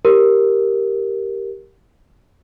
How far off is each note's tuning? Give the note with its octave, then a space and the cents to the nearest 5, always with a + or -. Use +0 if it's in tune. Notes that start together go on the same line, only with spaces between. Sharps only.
G4 +0 A#4 +0